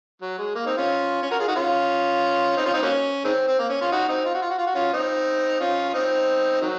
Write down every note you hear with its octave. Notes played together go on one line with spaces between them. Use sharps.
F#3
G#3
A#3
C4 D#4
C#4 F4
C#4
F#4 A#4
F4 G#4
D#4 F#4
C#4 F4
C4 D#4
C#4 F4
C4 D#4
F#3 A#3 C#4
D#3 G#3 C4
C4
A#3
C#4
C#4 F4
D#4 F#4
C4 D#4
F4
F#4
F4
F#4
F4
F#4
C#4 F4
C4 D#4
C#4 F4
F4
C4 D#4
D#3 F#3